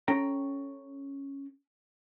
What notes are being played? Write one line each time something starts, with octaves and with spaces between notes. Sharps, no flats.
C#4 A4 G5 A#5